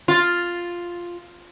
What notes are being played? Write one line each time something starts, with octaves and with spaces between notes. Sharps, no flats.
F4